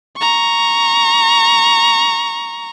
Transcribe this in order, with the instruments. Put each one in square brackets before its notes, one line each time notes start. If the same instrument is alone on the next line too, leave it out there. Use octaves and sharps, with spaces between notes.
[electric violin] A#5 C#6